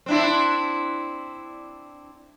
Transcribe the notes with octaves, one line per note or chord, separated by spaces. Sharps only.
C4 D4 E4